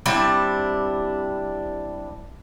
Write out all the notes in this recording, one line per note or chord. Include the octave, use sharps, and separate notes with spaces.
G3 C4 D4 E4